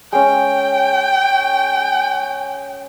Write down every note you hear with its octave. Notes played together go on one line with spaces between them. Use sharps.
G#3 C#4 G5